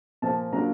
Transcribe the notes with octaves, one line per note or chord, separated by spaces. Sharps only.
A#2 F3 A#3 A5
F#3 A#3 D4 F4 A#5